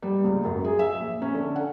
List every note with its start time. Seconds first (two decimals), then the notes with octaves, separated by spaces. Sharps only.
0.03 G3
0.24 C#2
0.45 F#2
0.64 G#4
0.79 E5
1.00 A#1
1.22 C#4
1.34 D3
1.56 F#5